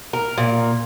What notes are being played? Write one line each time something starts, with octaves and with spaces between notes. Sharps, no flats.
A#4
A#2